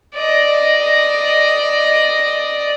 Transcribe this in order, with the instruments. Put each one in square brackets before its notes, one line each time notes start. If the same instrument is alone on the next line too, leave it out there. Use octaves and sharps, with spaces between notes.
[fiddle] D5 D#5